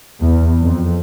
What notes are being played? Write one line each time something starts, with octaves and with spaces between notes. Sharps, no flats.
E2
F2